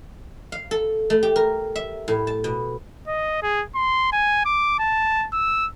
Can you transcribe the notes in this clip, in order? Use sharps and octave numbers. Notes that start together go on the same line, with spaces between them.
F5
A4
A3
G4
A#4
E5
A2
A5
B2
D#5
G#4
C6
G#5
D6
A5
E6